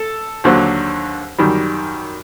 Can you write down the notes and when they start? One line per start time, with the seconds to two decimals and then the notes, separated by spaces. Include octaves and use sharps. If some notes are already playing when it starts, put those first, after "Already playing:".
Already playing: A4
0.44 D#2 D3 F#3 C5
1.38 F#2 D#3 G3